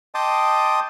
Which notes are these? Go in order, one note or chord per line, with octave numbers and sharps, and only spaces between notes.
D#5 G5 A5 C6 D6 D#6